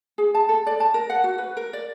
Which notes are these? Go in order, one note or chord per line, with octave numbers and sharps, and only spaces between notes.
G#4
A5
A4
D5
A5
A#4
F#5
F#4
B4
A#4
D5